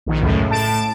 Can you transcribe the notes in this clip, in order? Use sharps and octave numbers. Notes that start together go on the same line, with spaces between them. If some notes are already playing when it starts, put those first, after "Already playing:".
A#1 D#3
C#2 F#2 A2
A2 A5 D7